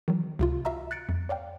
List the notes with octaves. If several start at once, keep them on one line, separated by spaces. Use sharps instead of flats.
D#3 E3 F#3
C#2 C3 F4
F#4 E5 F5 A#5 E6
F#6 A6 C#7 D7
F2
C#5 D5 F5 G5